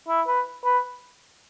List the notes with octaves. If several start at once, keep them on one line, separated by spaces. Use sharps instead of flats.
E4
B4
B4